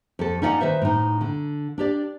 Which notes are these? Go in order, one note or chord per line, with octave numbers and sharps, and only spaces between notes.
F2 A4
C#4 D#4 E4 D5 D#5 F#5
D#3 B4 C5 E5
A2 D#4
D3
D4 G4 D5